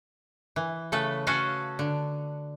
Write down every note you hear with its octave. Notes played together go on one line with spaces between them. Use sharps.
E3
C#3 A3 A4 B4
C#4 F#4 A4 B4 F5
D3